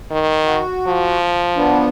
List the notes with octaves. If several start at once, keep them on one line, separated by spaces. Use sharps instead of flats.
D#3
F#4
F3
B3 D4